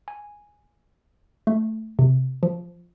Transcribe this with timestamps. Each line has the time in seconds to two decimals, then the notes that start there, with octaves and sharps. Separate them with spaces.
0.08 G#5
1.47 A3
1.99 C3
2.43 F3